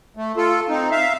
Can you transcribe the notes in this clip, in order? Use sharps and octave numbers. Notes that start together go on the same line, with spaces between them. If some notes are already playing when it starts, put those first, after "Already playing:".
A3
F4 A4
C4 D#4
E5 F5